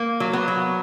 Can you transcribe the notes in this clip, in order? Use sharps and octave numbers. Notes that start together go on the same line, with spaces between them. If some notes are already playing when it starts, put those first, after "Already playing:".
Already playing: A#3
F#3
B3
F#3